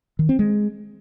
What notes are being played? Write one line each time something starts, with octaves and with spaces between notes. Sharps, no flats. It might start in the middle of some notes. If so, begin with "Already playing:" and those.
D#3
C4
G#3